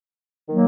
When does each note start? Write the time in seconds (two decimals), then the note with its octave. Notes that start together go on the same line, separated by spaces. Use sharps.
0.49 D#3 F#3 A#3